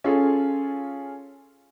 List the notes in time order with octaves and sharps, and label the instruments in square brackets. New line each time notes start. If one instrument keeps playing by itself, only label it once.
[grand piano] C#4 F4 G#4 A4